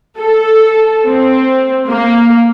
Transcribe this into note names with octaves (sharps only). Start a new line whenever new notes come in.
A4
C4
A#3